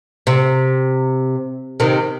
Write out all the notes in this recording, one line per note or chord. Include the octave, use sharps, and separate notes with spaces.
C3
C3 D#3